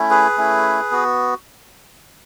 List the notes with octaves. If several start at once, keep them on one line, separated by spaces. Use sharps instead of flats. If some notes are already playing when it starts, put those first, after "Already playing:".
Already playing: A3 C#4 E4
G#4 B4
A3 C#4 E4
B3 F#4